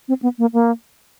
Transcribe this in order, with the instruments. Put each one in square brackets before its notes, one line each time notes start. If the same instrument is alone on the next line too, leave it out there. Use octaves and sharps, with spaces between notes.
[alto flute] C4
B3
A#3
A#3